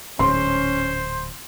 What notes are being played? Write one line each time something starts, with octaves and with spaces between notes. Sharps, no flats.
D1 G#2 C#4 C5 C6